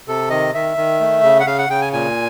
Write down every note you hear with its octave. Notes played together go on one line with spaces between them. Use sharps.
C3 A4
D#3 D#5
D#3 E5
D#3
A3
C#3
F#5
C#3 F5
F#5
C#3 G5
G#5
A#2 G#5